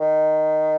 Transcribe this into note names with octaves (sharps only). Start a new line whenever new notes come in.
D#3